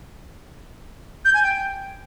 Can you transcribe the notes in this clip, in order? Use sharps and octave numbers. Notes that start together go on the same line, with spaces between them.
G6
G#5
G5